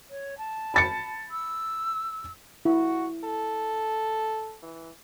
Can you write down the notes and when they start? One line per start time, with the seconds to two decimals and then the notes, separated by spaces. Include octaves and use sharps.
0.10 C#5
0.38 A5
0.74 B5 A6 C#7
1.31 E6
2.65 E4 F#4
3.24 A4
4.63 E3